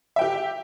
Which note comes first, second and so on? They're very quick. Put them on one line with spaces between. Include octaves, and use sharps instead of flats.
E5 G5 G4